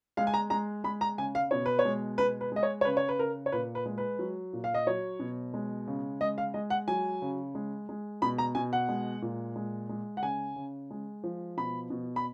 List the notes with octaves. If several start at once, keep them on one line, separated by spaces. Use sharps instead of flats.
G#3 F5
G#5
A#5
G#3 A#5
G#3 B5
A#5
C#3 G#5
F5
B2 C#5
B4
C#5
G#3
B2 B4
B4
G#3 D#5
C#5
C#5
C#3 B4
C#5
B4
C#3 A#4
C#5
A#2 B4
B4
G#3
B4
F#3
A#2
F5
D#5
F#3 C#5
B2
G#3
C#3
G#3 D#5
F5
G#3 D#5
F#5
F#3 G#5
C#3
G#3
G#3
B2 B5
A#5
B2 G#5
F#5
G#3
A#2
G#3
G#3
F#5
C#3 G#5
C#3
G#3
F3
B2 B5
B2
B5